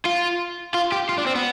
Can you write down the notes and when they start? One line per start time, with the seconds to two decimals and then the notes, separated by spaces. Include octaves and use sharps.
0.05 F4
0.74 F4
0.92 G4
1.09 F4
1.18 D4
1.26 C4
1.35 B3